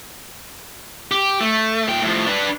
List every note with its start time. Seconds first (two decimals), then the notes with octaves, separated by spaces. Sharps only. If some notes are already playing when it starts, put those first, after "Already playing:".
1.11 G4
1.41 A3
1.87 A#2 G5
2.02 A2 F3
2.27 D4 B4